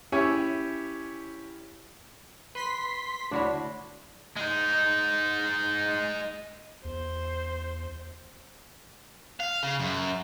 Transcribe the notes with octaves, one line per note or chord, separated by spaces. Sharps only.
C#4 E4 G4 C#5 E5 G#5
B4 C6 B6
D2 D4 E4 F#4 C#5
G#3 D#4
E2 C5
F5
C#3
F#2